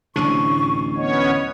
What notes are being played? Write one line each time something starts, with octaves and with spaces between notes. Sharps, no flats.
D1 A1 C3 D4 C#6
B3 C#4 C#5 D#5